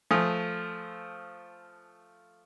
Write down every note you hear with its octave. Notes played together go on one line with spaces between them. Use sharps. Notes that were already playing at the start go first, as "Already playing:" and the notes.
F3 A3 G#5 D#6